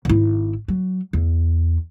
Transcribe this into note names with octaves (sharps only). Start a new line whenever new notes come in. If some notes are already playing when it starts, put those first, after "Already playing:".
G#1 E4
F#3
E2